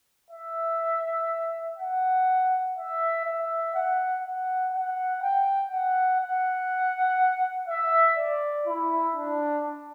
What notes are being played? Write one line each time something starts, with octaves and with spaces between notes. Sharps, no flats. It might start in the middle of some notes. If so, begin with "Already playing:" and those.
E5
F#5
E5
E5
F#5
F#5
F#5
G5
F#5
F#5
E5
D5
E4
D4